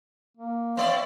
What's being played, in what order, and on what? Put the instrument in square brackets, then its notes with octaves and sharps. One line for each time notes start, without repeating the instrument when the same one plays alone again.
[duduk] A#3
[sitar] B3 D5 E5 [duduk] C#5 [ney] F5